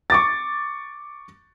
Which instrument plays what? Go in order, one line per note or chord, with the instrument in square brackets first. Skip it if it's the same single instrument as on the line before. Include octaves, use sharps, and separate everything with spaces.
[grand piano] C#6 D6 A6